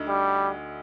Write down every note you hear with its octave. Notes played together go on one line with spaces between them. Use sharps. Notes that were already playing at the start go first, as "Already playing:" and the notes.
Already playing: D2 D3 A3 D#4
G3